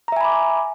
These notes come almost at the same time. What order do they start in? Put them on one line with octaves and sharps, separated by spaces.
A#5 E5 G#5 B5 D6